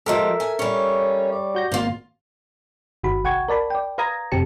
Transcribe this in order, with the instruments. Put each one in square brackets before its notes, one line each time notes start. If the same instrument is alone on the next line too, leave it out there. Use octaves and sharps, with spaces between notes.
[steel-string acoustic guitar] F3 G#3 G4 [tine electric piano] A4 A#4 E5
[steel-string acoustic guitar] G#5
[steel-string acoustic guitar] G3 C#5 [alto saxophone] C#4
[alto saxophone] D5
[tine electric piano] F#4 G6 A#6
[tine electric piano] G#1 [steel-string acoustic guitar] A#3 F4
[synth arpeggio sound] G1 D#3 F#4 B5
C2 F#5 G5 C#6 G#6
A#4 D5 A5 B5
D5 G5
B4 F5 A#5 D#6 G#6 A#6
F2 C3 C4 G4 A5 C#7